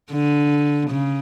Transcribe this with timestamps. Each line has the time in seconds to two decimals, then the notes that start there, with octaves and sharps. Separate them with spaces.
0.12 D3
0.90 C#3